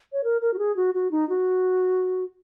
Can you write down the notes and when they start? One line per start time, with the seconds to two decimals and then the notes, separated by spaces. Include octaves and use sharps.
0.12 C#5
0.24 A#4
0.41 A#4
0.54 F#4
0.58 G#4
0.76 F#4
0.94 F#4
1.11 D#4
1.29 F#4